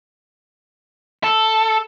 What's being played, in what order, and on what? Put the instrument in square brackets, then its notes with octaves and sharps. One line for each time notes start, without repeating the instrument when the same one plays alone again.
[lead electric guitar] A4